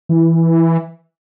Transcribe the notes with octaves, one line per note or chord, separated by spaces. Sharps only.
E3